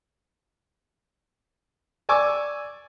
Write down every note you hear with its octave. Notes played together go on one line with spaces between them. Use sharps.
D5 G#5 C#6 D6 E6